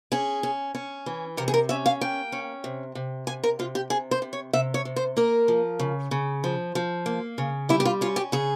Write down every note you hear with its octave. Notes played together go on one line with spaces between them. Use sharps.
C#4 G#4
C#4
C#4
E3
C3 A#4
G#4
A#4
C#4 E5
F5
A#3 G5
C#4
C3
C3
C3 G#5
A#4
C3 F4
G4
C3 G#4
C5
C3
C#5
C3 E5
C#5
C3
C5
A#3 A#4
F3
C#3
C#3
F3
F3
A#3
C#3
G3 E4
G4
F4
C#4 F4
G4
C#3 G#4